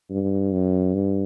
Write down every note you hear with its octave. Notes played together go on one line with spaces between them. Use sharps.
G2
F#2
G2